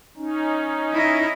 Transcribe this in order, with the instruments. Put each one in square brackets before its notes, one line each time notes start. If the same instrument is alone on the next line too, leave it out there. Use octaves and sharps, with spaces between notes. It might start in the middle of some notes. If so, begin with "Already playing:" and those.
[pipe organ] C#4 D#4
[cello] E4 D#5